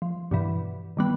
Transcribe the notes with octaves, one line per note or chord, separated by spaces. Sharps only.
F3
G2 B2 E3
D#3 G3 B3